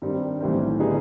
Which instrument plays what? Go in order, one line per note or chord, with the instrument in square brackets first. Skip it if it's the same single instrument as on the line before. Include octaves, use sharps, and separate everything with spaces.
[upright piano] G2 D#3 G3 C4
B1 A2 E3 G3 C4
D3 G3 B3 D#4 G#4